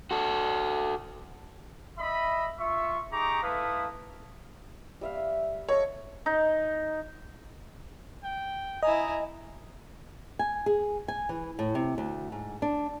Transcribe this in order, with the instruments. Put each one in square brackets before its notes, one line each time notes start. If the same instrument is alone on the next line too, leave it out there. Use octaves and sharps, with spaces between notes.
[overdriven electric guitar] F#4 A4
[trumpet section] D#5 E5 B5
F4 E5 C#6
D#4 G4 G#4 A#5 C#6 D6
A3 E4 A4 B4 F5 D#6
[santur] G3 E5 F5
E5
[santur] A4 D#5 F5 [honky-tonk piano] C#5
[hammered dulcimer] D#4
[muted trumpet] G5
[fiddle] E4 G#5 [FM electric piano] D#5 [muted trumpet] A#5
[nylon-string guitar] G#5
G#4
G#5
E3
A2
C3
D2
G#2
D4